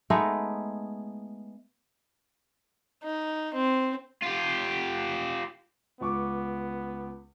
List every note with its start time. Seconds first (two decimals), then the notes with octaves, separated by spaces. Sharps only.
0.10 G#3 A3 B3 D#4
3.03 D#4
3.54 C4
4.22 F4 G4
6.01 C#2 B3 C#6 D6